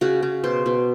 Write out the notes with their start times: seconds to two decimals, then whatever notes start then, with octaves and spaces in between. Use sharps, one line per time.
0.01 C#3 F#4
0.23 C#3
0.44 B2 C5
0.66 B2